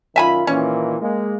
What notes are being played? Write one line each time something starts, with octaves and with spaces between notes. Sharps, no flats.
F#2 D#3 F4 E5 G#5 B5
A#2 D#3 E3 C#4
G#3 A#3